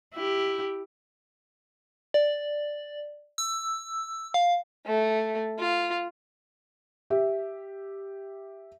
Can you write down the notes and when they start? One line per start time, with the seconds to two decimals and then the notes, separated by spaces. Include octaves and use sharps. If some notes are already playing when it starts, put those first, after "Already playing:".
0.15 E4 G4
2.14 D5
3.38 E6
4.34 F5
4.86 A3
5.59 F4
7.10 G4 E5